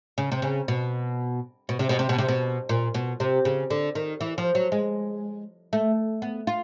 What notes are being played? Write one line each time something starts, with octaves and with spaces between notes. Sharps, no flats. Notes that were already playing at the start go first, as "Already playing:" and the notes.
C#3
C3
C#3
B2
B2
C3
B2
C3
B2
C3
B2
A#2
B2
C3
C#3
D3
D#3
E3
F3
F#3
G#3
A3
B3
F4